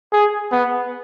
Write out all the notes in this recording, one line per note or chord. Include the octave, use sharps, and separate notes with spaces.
G#4
B3